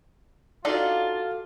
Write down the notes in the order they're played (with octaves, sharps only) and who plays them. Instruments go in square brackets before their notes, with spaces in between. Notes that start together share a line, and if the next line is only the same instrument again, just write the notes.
[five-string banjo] D4 D#4 D5 [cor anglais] F4 [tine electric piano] F#4 A4 F5